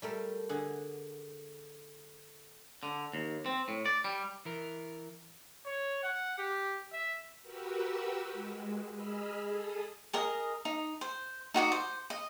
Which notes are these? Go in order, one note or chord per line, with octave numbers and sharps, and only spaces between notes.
G3 A3 A#4 F5
D3 G#4 F#5
D3
D#2
C4
A2
D5
G3
E3 A#4
C#5
F#5
G4
E5
F#4 G4 A#4 B4 E6
G#3
G#4 D#5 B5 E6 F6
G#4 A4 D#6
G#4 A#4 D#5
D#4
C5
D#4 F#4 D5 D#5
C5
D#5